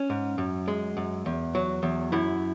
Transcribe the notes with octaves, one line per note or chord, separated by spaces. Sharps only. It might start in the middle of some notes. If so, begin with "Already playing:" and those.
Already playing: C#4
G#2
F#2
G#3
F#2
E2
F#3
E2
F#2 E4